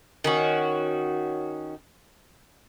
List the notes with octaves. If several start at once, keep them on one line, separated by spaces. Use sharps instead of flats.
D#3 C#4 F#4